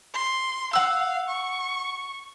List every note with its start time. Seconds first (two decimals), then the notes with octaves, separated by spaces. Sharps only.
0.14 C6
0.73 F5 F#5 E6
1.29 C#6